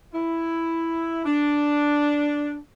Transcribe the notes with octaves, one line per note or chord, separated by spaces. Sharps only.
E4
D4